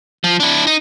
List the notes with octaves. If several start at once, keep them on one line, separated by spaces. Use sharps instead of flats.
F3
D4 E4
D#4